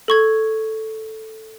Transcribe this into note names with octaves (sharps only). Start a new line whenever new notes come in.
A4 C#6 G#6